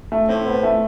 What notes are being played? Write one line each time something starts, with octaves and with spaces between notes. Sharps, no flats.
A3
A2 C4
B3
A3